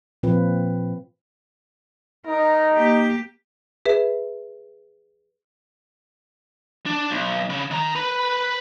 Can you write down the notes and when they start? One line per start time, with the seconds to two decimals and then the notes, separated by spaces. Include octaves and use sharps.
0.23 A#2 F3 C4 F4 B4
2.26 D#4 A#4
2.75 A#3 G4
3.86 G#4 B4 E5
6.86 D4
7.11 B1
7.50 C#3
7.71 D#3 A#5
7.96 B4 B5